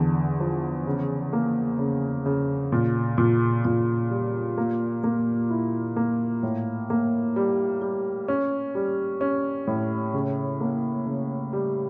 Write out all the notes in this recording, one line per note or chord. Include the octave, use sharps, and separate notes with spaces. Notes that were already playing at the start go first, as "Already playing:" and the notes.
Already playing: E2 D3
F3
C#3
A#3
C#3
C#3
A#2
A#2
A#2
G3
A#3
A#3
E4
A#3
A2
A#3
G3
G3
C#4
G3
C#4
A2
C#3
A#3
C#3
G3